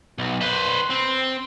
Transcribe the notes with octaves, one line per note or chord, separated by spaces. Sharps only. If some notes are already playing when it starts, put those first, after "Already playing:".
B1
B4 C5
C4